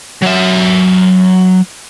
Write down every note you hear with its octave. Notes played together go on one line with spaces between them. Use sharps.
F#3 E5